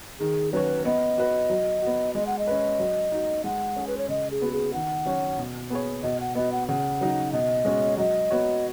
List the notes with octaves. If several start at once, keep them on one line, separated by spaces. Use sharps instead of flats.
D#3 G#4
F#3 C#4 F#4 B4 C#5
B3 D#5
F#4 B4
F#3
B3 F#4
G#3 D#5
F#5
D#5
C#4 B4
F#3
D#4 F#4
G#3 F#5
C#4 G#4
B4
C#5
C#3 D#5
G#4
B3 F#4
G#4
D#3 F#5
F#3 C#4 F#4 C#5
B2
B3 G#4 C#5
B2 D#5
F#5
B3 F#4 D#5
F#5
C#3 F#5
F#3 D#4 F#4
B2 D#5
G#3 C#4 F#4 C#5
F#3 D#5
B3 F#4 C#5